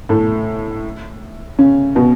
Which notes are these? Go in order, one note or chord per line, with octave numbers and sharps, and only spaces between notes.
A2 A3
C#3 C#4
B2 B3